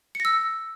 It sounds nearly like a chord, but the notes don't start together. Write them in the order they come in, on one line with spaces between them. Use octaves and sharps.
C#7 A#6 E6